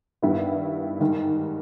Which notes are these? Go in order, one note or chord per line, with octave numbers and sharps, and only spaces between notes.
G2 D#3 G3 B3 E4
G#2 D#3 G3